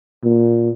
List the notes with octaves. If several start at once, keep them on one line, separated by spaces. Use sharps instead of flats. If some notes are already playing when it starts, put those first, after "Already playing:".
A#2